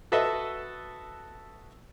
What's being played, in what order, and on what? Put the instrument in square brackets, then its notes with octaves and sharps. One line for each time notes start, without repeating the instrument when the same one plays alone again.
[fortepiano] F#4 A4 B4 D#5 E5